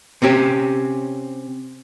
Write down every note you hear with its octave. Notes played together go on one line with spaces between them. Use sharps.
C3 C4 C#4 G4